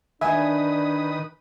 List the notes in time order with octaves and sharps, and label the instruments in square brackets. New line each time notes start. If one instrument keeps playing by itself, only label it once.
[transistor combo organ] D#3 B4 D#6 [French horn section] D4 [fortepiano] E5 G#5